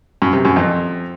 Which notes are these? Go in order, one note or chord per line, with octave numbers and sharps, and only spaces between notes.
F#2
C3
F#2
F2